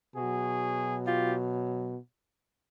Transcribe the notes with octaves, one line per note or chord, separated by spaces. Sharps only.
B2 F#3 F#4 G#4
F4 G4